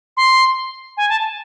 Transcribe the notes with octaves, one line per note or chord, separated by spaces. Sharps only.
C6
G#5
A5